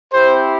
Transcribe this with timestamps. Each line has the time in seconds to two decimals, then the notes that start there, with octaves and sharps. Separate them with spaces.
0.13 C4 E4 G4 C5